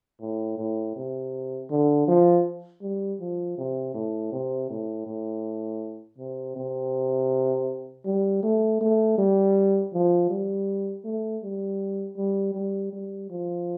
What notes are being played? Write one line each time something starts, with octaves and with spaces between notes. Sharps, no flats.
A2
A2
C3
D3
F3
G3
F3
C3
A2
C3
A2
A2
C3
C3
G3
A3
A3
G3
F3
G3
A3
G3
G3
G3
G3
F3